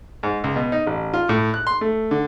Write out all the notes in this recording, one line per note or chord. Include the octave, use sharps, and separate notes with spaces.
G#2
C#2
B2
D#4
A1
F4
A2
F#6
C6
A3
D3